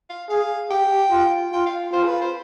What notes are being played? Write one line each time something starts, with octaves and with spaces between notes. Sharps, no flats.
F5
G#4 F5
G4 G5
F4
F4 G5
F5
F4 C5
G#4
B4
C5